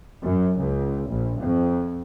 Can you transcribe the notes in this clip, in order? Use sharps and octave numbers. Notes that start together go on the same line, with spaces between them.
F#2
C#2
A#1
F2